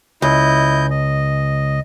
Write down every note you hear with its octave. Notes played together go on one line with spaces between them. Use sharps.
C#2 E4 D#5 G6
D#5